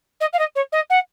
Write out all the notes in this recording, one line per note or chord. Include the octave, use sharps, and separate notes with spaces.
D#5
F5
D#5
C#5
D#5
F#5